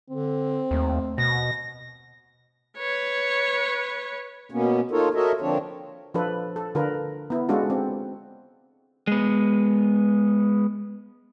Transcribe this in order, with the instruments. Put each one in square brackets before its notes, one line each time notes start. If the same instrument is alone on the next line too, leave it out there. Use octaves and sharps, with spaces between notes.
[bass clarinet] D3 [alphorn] C4
[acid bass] D#2 [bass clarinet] A3
[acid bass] B2 [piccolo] A#6
[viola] B4 C#5
[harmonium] B2 A#3 B3 C#4
D#4 F4 A4 A#4 C#5
F#4 A4 A#4 C#5 D#5 E5
D3 F3 A#3 C4 D4 C#5
[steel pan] F3 D4 F4 A4 B4
A4
D3 F4 A#4 B4
B3 E4
G#3 C#4 D4 F4 F#4 A4
C4
[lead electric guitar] G#3 B3